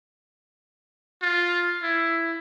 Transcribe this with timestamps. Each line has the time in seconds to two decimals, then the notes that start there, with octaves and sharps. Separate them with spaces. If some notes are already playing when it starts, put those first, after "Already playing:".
1.22 F4
1.83 E4